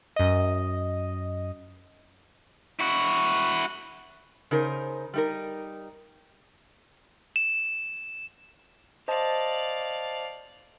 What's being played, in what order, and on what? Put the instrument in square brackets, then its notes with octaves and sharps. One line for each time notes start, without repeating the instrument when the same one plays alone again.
[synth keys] F#2 D#5
[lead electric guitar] E4 F#4
[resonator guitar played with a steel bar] C#3 D#4 A#4 C5
G3 D#4 A#4
[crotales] E7
[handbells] C5 D#5 A5 [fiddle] D5 F5